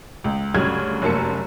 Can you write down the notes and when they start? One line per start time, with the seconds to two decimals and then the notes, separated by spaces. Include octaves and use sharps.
0.24 C#2
0.54 D2 G2 C#3 F#3 F6 G#6
1.02 F1 F#2 A#3 A5 C#7